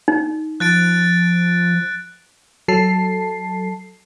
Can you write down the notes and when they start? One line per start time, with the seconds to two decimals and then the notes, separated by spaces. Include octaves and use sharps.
0.08 D#4
0.60 F3 F#6 A6 D7
2.68 F#3 A4 A5 C7